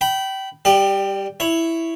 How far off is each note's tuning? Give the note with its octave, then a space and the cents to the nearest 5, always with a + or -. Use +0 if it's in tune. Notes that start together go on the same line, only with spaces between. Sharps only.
G5 -25 B5 +0
G3 +0 G4 +0 D5 +35
E4 +0 C#5 -5